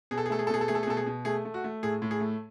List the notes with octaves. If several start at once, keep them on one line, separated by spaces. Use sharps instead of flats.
B2 G#4
A4
G#4
A3 A4
G#4
A4
B2 G#4
A4
A3 G#4
A4
G#4
B2 A4
G#4
B2
A3 G#4
A3
F#4
A3
A2 G#4
A2
G#4
A3